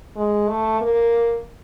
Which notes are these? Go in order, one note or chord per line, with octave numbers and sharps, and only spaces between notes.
G#3
A3
A#3